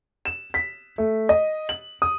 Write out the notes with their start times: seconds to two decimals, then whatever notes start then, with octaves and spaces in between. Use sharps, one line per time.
0.25 E7
0.54 B6
0.98 A3
1.29 D#5
1.69 F#7
2.02 D#6